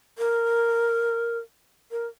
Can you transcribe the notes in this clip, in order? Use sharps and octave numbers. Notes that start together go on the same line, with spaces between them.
A#4
A#4